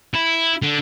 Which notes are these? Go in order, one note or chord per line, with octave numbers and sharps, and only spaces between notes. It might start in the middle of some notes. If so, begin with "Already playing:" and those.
E4
D3